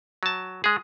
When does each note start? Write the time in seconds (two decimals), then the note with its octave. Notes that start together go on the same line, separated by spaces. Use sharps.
0.23 F#3 A5
0.64 G#3 G#4